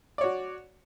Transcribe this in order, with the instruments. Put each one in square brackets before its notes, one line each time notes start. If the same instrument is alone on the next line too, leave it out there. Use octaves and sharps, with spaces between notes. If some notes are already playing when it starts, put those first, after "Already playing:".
[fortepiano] D5
C#5
F#4